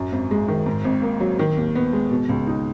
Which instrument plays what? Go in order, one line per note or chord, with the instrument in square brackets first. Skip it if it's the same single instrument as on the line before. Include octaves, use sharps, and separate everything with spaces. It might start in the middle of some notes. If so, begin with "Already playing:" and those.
Already playing: [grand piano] F#2
G#1
G#3
D#3
G#2
G#1
A#3
F#3
D#3
D#2
B3
G#3
B2
C#2
D#4